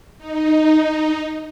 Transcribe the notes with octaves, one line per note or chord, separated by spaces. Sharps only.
D#4